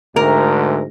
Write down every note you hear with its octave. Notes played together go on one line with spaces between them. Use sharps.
D2 G#2 A#4